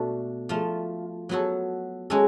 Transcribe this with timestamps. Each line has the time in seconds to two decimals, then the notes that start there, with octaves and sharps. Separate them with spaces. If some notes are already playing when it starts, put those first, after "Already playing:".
Already playing: B2 A3 D4
0.49 F3 A3 F4
1.29 F#3 B3 F#4 A4
2.10 G#3 C#4 F#4 A4